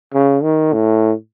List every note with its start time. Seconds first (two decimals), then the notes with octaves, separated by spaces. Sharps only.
0.14 C#3
0.43 D#3
0.73 A2